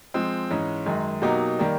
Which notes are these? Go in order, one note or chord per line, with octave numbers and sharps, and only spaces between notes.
F3 G#3 C4
G#2 E3 G#3 C#4
F#2 D#3 G#3
B2 F#3 A#3 D#4 G4
D#3 G3 A#3